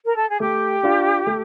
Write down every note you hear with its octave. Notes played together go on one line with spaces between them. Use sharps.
A#4
A4
G#4
A3 G4
D4 F4
A3